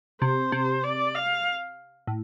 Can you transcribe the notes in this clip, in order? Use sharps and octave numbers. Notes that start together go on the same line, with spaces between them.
C3 C5
C3
D5
F5
A2